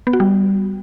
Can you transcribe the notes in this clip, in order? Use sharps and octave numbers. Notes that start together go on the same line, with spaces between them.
B3
F#4
G3